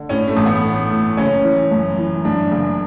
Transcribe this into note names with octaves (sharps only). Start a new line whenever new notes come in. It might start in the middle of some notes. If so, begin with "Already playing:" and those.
Already playing: D3
A2 C#4
A3
A1
B3
A2
A2
F#1 C#4
E3
F#2
E3
F#2 D4
F#1